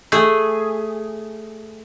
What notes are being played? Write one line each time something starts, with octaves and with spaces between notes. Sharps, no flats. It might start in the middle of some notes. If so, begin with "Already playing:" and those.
A3 G#4